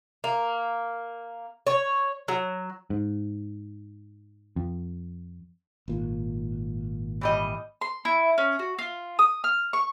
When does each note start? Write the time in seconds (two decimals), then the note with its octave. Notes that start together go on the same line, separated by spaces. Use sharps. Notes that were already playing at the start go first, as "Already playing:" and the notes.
0.24 A#3
1.67 C#5
2.28 F#3
2.90 G#2
4.56 F2
5.88 G#1 A#2
7.21 E3 G3 D#5
7.81 C6
8.05 E4
8.38 C#4
8.59 F#4
8.79 F4
9.19 D#6
9.44 F6
9.73 C#6